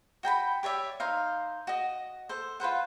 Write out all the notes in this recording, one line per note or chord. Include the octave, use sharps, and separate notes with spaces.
F#4 G5 A#5 B5
G4 C#5 D5 E5
D#4 C5 F5
F#4 D#5
A4 C5
F4 B4 C5 F#5